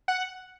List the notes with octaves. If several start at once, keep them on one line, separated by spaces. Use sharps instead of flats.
F#5